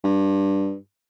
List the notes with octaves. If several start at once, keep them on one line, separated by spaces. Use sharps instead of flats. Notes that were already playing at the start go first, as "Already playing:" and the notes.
G2